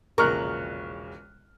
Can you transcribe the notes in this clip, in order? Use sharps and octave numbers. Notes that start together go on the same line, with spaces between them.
E1 A#1 C#3 A#4 C#6 F6 F#6